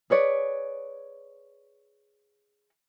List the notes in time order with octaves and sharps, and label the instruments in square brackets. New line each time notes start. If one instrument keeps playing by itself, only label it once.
[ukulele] G#4 B4 C#5 D5